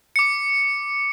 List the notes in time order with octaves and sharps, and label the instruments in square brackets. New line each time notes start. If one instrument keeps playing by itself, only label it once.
[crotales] D6 C#7